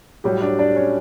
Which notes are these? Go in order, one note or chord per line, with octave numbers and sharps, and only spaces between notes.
A2 F#3 G3 G4
D4 D5
D4 D5
C#4 C#5